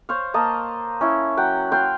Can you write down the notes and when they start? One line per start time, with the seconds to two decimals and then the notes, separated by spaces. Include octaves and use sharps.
0.09 C5 C#5 F5
0.34 A#3 D#5 A5
1.01 C#4 E4
1.37 F#3 F#5 G5
1.72 F5 G5 C6